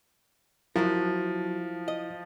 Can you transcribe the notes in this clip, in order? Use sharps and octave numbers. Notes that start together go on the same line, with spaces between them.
F3 F#3 E4 F#4 A#4
D#5